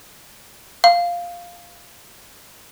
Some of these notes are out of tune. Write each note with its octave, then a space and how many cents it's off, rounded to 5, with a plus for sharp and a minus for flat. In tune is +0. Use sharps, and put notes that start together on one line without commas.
F5 +0